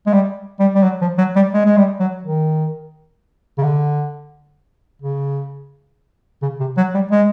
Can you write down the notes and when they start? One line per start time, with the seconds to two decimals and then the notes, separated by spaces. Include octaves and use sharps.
0.07 G#3
0.13 G3
0.60 G3
0.75 G3
0.83 F#3
1.01 F3
1.18 F#3
1.36 G3
1.54 G#3
1.65 G#3
1.77 G3
2.00 F#3
2.23 D#3
3.58 C#3
3.63 D3
5.02 C#3
6.42 C#3
6.60 C3
6.77 F#3
6.94 G3
7.11 G#3